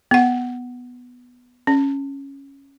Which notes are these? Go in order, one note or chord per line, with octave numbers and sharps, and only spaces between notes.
B3 F#5
C#4